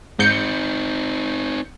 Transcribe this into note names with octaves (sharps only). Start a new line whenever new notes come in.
G#2 C4 D#4 G6 C#7